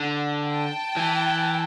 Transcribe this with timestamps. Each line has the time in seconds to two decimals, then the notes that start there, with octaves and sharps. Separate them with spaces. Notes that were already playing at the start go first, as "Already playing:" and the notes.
Already playing: D3
0.43 G5 A5
0.97 E3